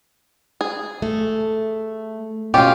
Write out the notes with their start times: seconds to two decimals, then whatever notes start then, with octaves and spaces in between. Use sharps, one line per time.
0.61 G#4
1.02 A3
2.54 B2 C#4 F4 G4 F5